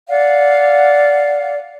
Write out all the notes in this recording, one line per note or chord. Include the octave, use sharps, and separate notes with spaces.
D5 F5 F#5